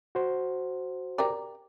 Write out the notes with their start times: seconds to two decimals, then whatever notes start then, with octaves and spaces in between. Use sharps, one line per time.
0.15 F#4 C5
1.18 G4 A#4 D5